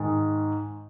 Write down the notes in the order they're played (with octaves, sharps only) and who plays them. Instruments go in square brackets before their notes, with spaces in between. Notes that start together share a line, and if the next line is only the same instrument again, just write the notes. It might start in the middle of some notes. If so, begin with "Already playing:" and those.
Already playing: [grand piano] G#2 D#3 G#3